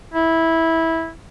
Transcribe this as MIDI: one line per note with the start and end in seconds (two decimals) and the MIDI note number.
0.14 1.09 64